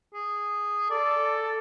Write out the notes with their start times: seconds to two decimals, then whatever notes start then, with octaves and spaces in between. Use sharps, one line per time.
0.14 G#4
0.90 A4 D5